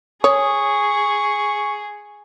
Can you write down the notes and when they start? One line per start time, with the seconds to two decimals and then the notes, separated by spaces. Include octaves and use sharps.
0.24 G#4 C#5 C#6 D#6